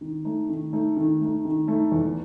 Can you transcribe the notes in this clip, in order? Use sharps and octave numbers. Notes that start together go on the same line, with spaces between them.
D#3
A3 D#4
D#3
A3 D#4
D#3
A3 D#4
D#3
A3 D#4
E2